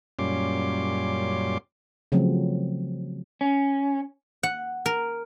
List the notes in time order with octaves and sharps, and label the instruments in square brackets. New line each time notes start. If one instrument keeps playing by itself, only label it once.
[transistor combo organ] F#2 A#2 G3 C#4 C6 D6
[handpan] C#3 F3 F#3 A3 C4
[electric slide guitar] C#4
[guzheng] F#5
A#4